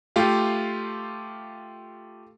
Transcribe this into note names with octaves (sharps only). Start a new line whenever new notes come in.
A3 F4 G4 F5